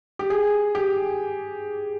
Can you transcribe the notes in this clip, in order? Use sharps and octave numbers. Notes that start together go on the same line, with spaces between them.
G4
G#4
G4